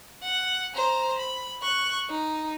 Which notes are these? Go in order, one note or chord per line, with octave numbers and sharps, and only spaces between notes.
F#5
C5 A#5
B5
C#6 F#6
D#4